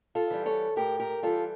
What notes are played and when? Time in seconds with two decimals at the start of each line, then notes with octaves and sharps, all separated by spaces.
0.15 F4 A4
0.31 E3 G3
0.46 A4 C#5
0.76 A2 G4 A#4
1.00 G4 A#4
1.22 E3 G3 F4 A4